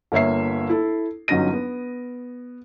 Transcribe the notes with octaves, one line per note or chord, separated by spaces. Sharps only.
G1 A#3 C#5 E5 C7
E4 A4
G1 F#3 C#4 D#4 A#6 D#7
B3